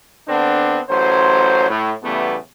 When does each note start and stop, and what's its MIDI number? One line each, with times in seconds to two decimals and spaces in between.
0.27 0.78 50
0.27 0.78 59
0.27 0.78 60
0.27 0.78 62
0.89 1.67 33
0.89 1.67 54
0.89 1.67 61
0.89 1.67 72
1.69 1.92 45
2.03 2.36 40
2.03 2.36 49
2.03 2.36 55
2.03 2.36 57
2.03 2.36 59